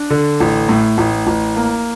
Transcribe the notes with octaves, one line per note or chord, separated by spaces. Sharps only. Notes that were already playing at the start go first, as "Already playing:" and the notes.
Already playing: D4
D3
A1
A2
A1
A1
A#3